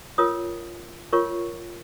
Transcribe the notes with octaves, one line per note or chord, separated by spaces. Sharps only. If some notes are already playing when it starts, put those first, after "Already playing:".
F4 A#4 C#5 D#6
F4 A#4 C#5 C#6